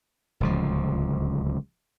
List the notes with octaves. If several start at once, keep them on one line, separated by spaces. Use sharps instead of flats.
D1 C#2 F3